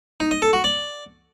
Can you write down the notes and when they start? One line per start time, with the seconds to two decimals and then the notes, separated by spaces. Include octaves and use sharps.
0.20 D#4
0.31 D#5
0.42 A4
0.53 F#4
0.64 D5